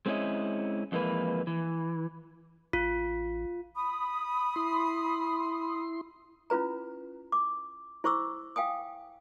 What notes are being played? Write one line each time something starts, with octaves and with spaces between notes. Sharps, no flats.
G#3 C4 C#4 E4 C#5 D#5
F2 E3 G#3 A#3 B4
E3
A1 F4
B5 D#6
E4 C6
C#4 E4 F4 B4 A#5
D6
E4 C5 C#6 D6 E6
F5 G5 G#5 D#6